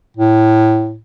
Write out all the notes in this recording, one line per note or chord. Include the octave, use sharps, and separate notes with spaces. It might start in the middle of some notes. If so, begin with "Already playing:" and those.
A2